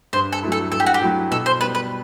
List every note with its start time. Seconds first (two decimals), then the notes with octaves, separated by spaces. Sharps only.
0.13 G2 C5
0.33 A4
0.43 F#3 A3 E4
0.52 A4
0.72 G2 A4
0.80 G4
0.86 F#4
0.94 G4
1.02 F#3 A3 E4
1.31 B2 A4
1.46 C5
1.60 G3 B4
1.64 B3
1.75 B4